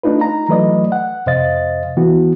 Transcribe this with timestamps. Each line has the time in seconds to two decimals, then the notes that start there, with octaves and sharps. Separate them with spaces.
0.03 A3 D4 D#4 F4 B4
0.21 D#4 A#5
0.49 E3 F#3 A3 B4 D5 D#5
0.92 F#5
1.26 F2 C3 C5 D#5 F5 A6
1.97 E3 B3 F#4